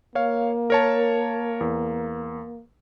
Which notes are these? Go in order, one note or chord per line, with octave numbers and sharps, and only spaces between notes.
A#3 C#5 F5
A#4 C#5 A5
E2